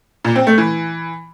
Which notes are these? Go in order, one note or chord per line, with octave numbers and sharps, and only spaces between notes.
A#2
C4
A3
E3